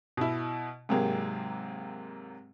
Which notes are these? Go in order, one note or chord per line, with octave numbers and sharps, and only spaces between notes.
B2 E4
G#2 C3 F#3 A#3 G4 G#4